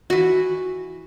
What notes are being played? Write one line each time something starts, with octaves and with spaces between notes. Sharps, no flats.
E3 F#4